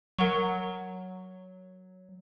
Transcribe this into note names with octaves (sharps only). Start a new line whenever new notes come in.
F#3 A#4 F#5 C#6